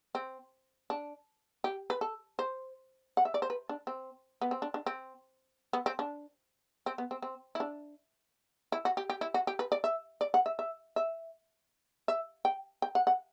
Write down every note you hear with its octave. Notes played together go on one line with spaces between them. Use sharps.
C4
D4
G4
B4
A4
C5
F#5
E5
D5
C5
B4
D4
C4
B3
C4
D4
D4
C4
B3
C4
D4
C4
B3
C4
C4
E4
D4
E4
F#4
G4
G4
E4
F#4
G4
B4
D5
E5
D5
F#5
E5
E5
E5
E5
G5
G5
F#5
F#5